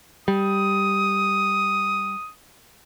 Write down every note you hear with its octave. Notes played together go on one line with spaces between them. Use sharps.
G3 D#6